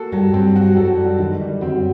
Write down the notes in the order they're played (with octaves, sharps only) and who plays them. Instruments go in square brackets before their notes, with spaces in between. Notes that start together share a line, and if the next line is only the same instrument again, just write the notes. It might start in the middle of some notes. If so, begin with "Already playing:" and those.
Already playing: [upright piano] A#3 F#4 A4
[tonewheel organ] G2 G3 [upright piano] F#3
[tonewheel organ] G2 G3 [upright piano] C4
[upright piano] F#4
[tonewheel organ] F#2 F#3 [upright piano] A4
[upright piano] G3
[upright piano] D3 [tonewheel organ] D#3
[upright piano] G3
[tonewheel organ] F#2 F#3 [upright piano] C4